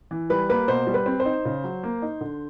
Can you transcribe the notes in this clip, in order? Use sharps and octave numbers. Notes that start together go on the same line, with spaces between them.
E3
G3 B4
A#3 B4
B2 C5
G3
B4
C4
C5
D#4
C#3
F#3
A#3
D#4
D3